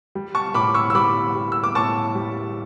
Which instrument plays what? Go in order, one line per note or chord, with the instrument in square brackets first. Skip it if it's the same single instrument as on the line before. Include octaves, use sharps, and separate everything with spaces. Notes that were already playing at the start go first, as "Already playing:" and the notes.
[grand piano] G3
A5 C#6
A2 B5 D6
C#6 E6
E6
G3 B5 D6
G3
E6
D6
A2 A5 C#6
G3